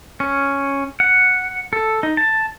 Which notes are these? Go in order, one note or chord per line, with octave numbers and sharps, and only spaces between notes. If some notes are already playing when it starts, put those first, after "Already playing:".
C#4
F#5
A4
D#4
A5